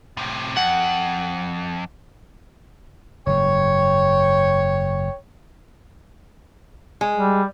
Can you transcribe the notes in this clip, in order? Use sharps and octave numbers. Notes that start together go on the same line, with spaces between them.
A2 C3
F2 F#5
F#1 G#2 C#5 G5
G#3
G3